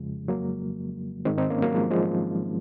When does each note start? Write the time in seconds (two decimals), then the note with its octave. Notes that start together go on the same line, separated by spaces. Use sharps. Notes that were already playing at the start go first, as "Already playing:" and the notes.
Already playing: F2 C#3 F3 G#3
0.28 F#3 A#3
1.25 G#2 D#3 G#3 C4
1.38 C4 D#4
1.50 A#3 C#4
1.62 F#3 A#3
1.74 F3 G#3
1.91 F3 G#3